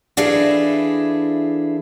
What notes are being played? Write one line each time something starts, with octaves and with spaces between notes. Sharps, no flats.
E3 D4 E4 F4 G#4 A4